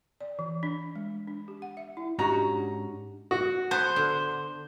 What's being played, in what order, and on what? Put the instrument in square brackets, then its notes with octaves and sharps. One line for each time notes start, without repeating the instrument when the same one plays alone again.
[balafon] D5
E3
D4
G#3
D4
G4
F#5
E5
E4
[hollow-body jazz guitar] G#2 C#4 F#4 [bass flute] D4 [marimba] G4 C#6 [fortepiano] A#5
[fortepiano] F#4
[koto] B3 [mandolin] C5
[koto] D3